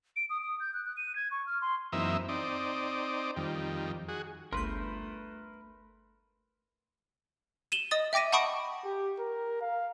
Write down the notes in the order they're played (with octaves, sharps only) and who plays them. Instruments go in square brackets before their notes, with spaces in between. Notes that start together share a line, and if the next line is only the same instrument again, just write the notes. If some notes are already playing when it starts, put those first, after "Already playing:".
[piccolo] D7
D#6
D#6
G6
F#6
F#6
D#7
G#6
C#6
F6
C6
[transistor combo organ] F#2 E3 A#3 C4 D#4 E5
C4 D#4 D5
F2 D#3 G3
F#4 G#4
[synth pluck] G1 C#2 G6 [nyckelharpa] A3 [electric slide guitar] A#4 B4 [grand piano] C6
[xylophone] D#7 E7 F#7 G7
D#5 D#6 A6
E5 G5 D6 A#6 D#7
F#5 A5 B5 C#6 D#6 D7
[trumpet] G4
A#4
F5